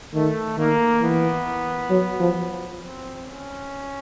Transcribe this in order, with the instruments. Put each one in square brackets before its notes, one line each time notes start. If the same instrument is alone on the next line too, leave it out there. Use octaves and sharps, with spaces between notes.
[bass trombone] D#3 [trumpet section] A3
[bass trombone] D#3 [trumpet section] A#3
[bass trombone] E3 [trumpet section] B3
[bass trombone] F#3
F3
[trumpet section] C4
C#4